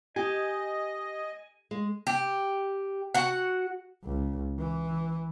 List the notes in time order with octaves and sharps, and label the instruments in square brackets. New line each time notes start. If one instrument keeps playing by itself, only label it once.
[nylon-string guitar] G4 [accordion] D#5 [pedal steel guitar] G#5
[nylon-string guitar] G#3
[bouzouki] G4
F#4 F#5
[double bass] C#2
E3